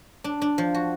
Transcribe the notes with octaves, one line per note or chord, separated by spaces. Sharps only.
D4
D4
F3
F#4